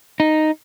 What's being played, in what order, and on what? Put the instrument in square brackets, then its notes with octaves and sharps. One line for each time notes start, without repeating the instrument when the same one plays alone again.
[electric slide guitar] D#4